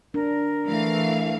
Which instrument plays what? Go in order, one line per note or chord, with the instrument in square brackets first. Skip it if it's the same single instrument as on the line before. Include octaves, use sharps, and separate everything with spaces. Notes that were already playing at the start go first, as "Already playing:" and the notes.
[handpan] D4 [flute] A#4
[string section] E3 F5 [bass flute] A3